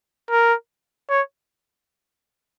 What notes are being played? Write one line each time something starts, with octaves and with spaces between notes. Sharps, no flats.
A#4
C#5